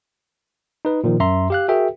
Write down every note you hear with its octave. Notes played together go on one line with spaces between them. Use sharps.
D#4 B4
A#2 D#3 F3
F#2 E5 A#5 C6
G4 F5 F#6
F#4 G#4 A#4 E5 G5